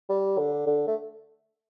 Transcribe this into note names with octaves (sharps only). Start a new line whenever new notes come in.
G3
D3
D3
A3